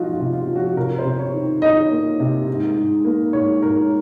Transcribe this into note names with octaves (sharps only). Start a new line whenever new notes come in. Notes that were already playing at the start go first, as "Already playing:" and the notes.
Already playing: F3 G#3 D#4 F4 F#4
F4
C3
F4
F3
F#4
C3 A#4
C5
C3
C#5
D#3
D#3 D#5
A#3
C3
G#2
G#2
A#3
G#2 C#5
G#2 A#4